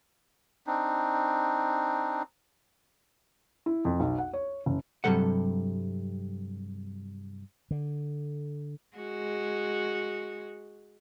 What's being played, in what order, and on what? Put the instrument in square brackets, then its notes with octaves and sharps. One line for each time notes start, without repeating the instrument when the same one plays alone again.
[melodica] C4 D4 D#4
[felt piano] E4
F2
B1
F#5
C#5
F#1
[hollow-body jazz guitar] G2 C3 F#3 G3 A4 F#5
[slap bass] D3
[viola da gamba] G#3 F#4